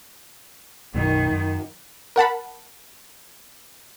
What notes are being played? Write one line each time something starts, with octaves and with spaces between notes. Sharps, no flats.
B1 F#2 D#3
F#2
A#4 F#5 A5 B5